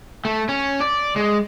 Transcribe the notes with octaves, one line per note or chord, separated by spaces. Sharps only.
A3
C#4
D5
G#3